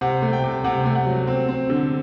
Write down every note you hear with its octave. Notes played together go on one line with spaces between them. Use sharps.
C3 F#5
A3
G5
C3
C3 F#5
A3
F#5
F#3
C4
C4
D3